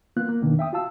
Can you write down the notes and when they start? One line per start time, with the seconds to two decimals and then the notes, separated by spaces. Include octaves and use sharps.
0.17 A#3 B3 F4 F#6
0.28 A#3
0.41 F2 B2 D#3 A#3 B3 D4
0.59 E5 G5 D#6
0.73 F4 F#4 F5 A5 E6